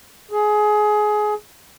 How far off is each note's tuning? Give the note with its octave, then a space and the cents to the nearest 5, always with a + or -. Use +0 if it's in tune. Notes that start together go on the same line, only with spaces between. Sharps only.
G#4 +20